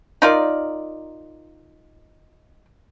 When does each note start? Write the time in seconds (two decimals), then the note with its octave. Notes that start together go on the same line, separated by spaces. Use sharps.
0.22 D#4 F4 A#4 D5